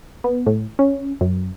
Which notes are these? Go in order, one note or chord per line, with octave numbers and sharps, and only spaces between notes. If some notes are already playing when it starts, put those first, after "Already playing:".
B3
A2
C#4
F#2